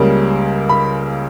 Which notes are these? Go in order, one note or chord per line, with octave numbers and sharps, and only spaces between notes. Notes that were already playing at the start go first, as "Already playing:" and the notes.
Already playing: C#2 C#3 G3 A#3
B5